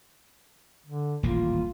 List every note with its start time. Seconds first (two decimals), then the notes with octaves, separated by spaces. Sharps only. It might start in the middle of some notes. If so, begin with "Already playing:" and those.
0.86 D3
1.23 D#1 A1 A#3 F4